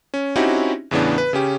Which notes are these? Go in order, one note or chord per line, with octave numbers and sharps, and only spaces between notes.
C#4
C4 C#4 D#4 E4 F#4 G4
E2 A2 C#3 E3 B3 D4
B4
C#3 C#4 G4